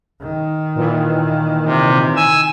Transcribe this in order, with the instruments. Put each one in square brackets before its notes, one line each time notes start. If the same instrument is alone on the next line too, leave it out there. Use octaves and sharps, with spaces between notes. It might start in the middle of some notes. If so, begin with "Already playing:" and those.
[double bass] D#3
[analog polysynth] A#2 E3
[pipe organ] C3
G#5 E6